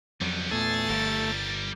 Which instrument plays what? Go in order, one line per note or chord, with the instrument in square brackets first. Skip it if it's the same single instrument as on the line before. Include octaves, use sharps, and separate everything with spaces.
[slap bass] F2 F#3 [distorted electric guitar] G3 B3
[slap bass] E2 A#2 [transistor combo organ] A3 [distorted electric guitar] G#4 [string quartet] A6
[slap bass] G1 [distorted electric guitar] G3 A#4